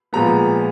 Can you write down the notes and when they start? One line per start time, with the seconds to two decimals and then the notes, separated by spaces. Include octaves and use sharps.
0.13 A#2 F3 G#3 B3 A#5